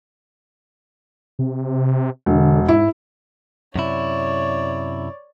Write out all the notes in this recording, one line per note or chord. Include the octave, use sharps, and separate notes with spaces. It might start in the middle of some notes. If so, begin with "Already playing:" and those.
C3
E1 D3
G#2 E4
F#2 C3 E4 C#5 D5